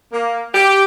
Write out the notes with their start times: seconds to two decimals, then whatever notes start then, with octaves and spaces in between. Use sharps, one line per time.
0.13 A#3
0.54 G4